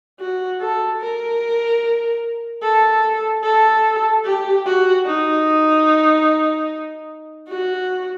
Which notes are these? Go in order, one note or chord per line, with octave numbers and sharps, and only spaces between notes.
F#4
A4
A#4
A4
A4
G4
F#4
D#4
F#4